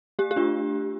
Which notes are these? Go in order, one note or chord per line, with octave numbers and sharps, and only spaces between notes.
A3 G4
G4
D4 F4